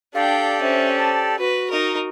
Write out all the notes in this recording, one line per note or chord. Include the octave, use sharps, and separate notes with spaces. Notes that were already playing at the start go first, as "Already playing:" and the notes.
D4 G4 A4 D5 F5 G5
C#4 C5 E5
A5
F#4 B4
D#4 A#4